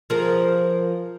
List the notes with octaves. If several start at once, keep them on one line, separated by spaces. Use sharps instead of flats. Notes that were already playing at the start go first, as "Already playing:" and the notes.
F3 G#4 A#4